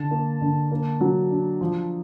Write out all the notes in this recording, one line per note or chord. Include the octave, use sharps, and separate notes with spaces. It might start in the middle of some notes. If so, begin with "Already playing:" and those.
Already playing: D3 A5
A#3
D3
A#3
F#3
D4
F3